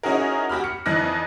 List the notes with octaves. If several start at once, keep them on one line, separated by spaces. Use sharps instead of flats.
C#4 D#4 E4 F#4 G#4 A#4
F#4 G4 B5 F6
C#7
F2 E3 D#4 D5 F#6 A#6